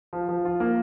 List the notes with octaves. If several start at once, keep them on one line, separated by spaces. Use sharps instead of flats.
F3
F3
F4
A#3